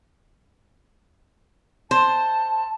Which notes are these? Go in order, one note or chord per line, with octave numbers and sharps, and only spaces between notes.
C5 A5